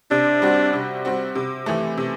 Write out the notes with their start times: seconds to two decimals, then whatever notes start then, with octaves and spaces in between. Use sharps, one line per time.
0.11 C3 D4
0.42 G3 C4 F#4
0.73 C3
1.05 G3 C4 F#4
1.35 C3
1.66 E3 A3
1.97 C3